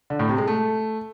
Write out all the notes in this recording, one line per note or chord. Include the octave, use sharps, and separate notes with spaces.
D3
A2
C3
G#3
A3